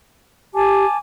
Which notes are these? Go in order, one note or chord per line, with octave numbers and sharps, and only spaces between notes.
G4 G#5 A5 D6